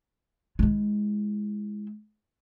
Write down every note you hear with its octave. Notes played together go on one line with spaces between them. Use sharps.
G#3 E4